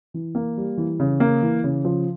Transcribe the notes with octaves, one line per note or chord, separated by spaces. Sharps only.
E3
A#3
G3
E3
C#3
A#3
E3
C#3
F3